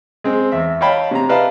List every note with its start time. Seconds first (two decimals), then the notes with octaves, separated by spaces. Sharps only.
0.24 G#3 C4
0.52 E2 E5
0.81 C#5 D#5 F5 G5 A5 B5
1.11 C3 A#5
1.29 E4 B4 D5 D#5 F5 A5